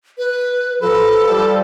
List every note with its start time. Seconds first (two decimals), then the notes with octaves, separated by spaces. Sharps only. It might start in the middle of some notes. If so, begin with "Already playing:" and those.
0.18 B4
0.81 F3 A4 B4
1.29 F3 G3